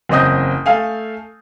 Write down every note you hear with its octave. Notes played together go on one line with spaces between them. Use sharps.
F#1 E2 C4 D#5 D#6 G6
A3 A4 F5 G#5